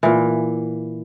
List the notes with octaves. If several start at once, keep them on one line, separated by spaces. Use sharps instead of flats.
A#2 E3